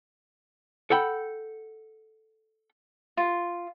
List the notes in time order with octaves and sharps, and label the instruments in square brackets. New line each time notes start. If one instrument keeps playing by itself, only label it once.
[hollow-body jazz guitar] A4 F#5 G5 B5
[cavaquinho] F4